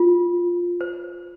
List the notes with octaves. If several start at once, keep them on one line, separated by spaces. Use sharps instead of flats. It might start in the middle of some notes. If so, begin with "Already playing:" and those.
Already playing: F4
C5